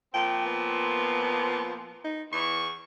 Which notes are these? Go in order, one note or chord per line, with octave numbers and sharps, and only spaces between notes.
A#2 F3 C4 G5
B3
D#4
E2 C#6